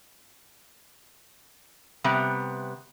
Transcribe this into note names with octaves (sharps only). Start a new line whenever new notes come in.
C3 G3 B3